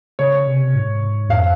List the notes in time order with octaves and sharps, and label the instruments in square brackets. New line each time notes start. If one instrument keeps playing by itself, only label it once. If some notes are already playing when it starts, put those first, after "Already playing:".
[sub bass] C#3 [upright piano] C#5
[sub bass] C3
G#2
[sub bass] F2 [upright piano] F5